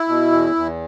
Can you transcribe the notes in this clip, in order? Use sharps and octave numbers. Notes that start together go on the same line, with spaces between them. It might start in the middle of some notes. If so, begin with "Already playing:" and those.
Already playing: E4
B2
E2
E2